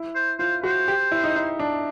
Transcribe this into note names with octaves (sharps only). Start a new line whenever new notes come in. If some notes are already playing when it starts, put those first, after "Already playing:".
Already playing: E4
C5
F4 C5
F#4 C5
G4
E4
D#4
D#4
D4